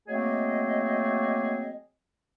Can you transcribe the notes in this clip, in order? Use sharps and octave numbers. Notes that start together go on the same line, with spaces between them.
F#3 A3 A#3 C4 G#4 D#5